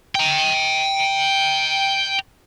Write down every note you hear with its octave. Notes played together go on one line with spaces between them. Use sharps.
G5 A#5